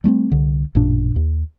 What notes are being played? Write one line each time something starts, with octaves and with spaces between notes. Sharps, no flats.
G3 A3 B3 C4
C2 D3
A1 F#2 A#2 D4
D#2